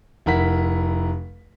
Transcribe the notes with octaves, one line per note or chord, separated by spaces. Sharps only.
F1 E4 A#4 F#5 B6